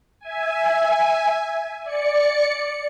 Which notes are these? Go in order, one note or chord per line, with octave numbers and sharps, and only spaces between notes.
E5 G#5
D5 C#7